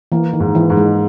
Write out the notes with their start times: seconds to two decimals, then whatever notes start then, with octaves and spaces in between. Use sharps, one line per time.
0.12 E3 A#3
0.33 D#3
0.40 G#2
0.55 E3
0.70 G#2
0.77 G#3